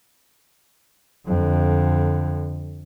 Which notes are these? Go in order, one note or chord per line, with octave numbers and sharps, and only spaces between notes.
F2 D3